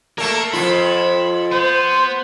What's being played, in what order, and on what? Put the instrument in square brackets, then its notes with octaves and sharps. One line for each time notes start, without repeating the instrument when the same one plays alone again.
[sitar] A3 A#3 [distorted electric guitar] A#4
[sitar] F2 F4 [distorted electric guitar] B5
[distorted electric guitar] B3 [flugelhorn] C5